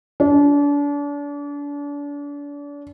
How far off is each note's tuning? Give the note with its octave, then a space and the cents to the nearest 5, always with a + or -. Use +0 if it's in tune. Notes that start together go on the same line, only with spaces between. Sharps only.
D4 -35